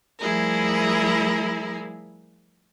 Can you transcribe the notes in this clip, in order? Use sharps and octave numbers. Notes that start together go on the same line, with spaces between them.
F3 G3 A3 E4 G#4 A#4